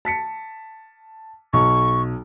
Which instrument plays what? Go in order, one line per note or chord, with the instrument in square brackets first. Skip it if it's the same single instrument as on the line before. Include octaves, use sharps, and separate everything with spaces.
[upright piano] A5 B6 C#7
[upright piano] B1 [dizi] C#6